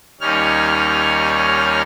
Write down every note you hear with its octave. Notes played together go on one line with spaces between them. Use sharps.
D#2 G3 C#4 D#4 C#5 F6